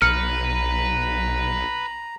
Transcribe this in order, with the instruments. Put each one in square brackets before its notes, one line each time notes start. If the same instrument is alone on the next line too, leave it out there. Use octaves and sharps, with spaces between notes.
[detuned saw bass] B1 [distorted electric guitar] B4 [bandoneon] A#5 [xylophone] F6 C#7